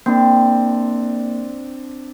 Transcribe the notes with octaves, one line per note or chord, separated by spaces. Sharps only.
A#3 C4 D4